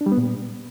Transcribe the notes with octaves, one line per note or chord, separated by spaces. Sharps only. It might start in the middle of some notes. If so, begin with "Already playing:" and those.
D4
G3
B3
A#2